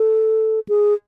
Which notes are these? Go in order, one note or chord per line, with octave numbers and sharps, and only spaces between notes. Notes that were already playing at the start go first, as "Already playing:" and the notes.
Already playing: A4
G#4